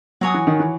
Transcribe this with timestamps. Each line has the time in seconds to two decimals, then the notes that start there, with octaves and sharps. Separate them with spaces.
0.21 F#3 F#4 C#5 G#5 D#6
0.34 E3
0.47 D#3
0.60 E3